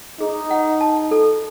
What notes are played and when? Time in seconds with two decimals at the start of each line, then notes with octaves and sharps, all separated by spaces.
0.20 D#4 G#4
0.51 F#5
0.81 A5
1.11 A4